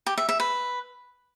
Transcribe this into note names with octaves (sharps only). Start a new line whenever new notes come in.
G4
E5
E5
B4